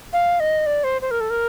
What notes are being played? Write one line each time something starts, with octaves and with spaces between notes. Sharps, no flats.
F5
D#5
D5
C5
C5
A#4
A4
A#4